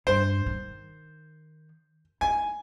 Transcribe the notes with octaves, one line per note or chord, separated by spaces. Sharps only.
G2 C5
D#3
E4 G#5